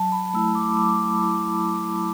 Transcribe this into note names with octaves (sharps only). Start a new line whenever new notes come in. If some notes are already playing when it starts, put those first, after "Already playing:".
Already playing: F#3 A5
B5
A3 E4 E6
D6
F#3 D6
A3 E4
F#3